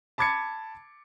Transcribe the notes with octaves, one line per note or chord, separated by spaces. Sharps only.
A5 B5 D6 G#6 A6 C#7